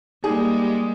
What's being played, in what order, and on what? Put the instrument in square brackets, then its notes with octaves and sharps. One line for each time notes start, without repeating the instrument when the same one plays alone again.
[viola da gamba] G3 G#3 A#3 [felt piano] D#4 G#4